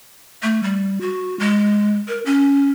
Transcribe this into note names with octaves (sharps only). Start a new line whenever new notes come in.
A3
G3
F#4
G#3
A#4
C#4